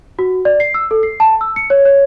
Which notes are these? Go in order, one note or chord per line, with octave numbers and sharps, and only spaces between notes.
F#4
D5
C7
E6
A4
C7
A5
E6
C#7
C#5
C#5